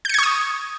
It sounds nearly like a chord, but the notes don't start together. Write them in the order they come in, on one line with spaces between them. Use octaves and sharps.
G6 C#7 G#6 C#6 D#6